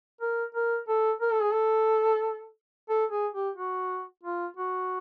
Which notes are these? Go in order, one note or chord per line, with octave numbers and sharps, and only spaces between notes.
A#4
A#4
A4
A#4
A4
G#4
A4
A4
G#4
G4
F#4
F4
F#4